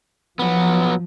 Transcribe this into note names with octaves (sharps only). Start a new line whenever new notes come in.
F3 F#3 B3